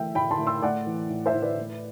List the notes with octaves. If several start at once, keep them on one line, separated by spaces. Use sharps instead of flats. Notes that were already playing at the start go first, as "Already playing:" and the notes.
Already playing: E3 A3 E5 G5
A2 G5 B5
A5 C6
A2
C6 E6
A3 D5 F#5
E3
A2
C5 E5
A2
B4 D5
A3